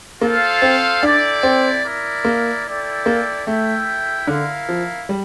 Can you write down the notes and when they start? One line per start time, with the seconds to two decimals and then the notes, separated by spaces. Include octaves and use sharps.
0.21 A#3 F4 A4 C5 F5
0.62 C4
1.02 D4 E4 A4 D5 G5
1.43 C4
1.84 E4 A#4 D5
2.25 A#3
2.66 E4 A4 D5 G5
3.06 A#3
3.47 A3 E4 A4 E5 G5
4.27 D3 E4 A#4 F5
4.69 F3
5.09 G3